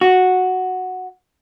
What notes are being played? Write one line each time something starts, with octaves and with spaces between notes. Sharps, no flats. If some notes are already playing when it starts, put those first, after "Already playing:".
F#4